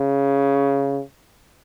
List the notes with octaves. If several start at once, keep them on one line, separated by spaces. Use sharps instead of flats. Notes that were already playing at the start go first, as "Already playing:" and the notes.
Already playing: C#3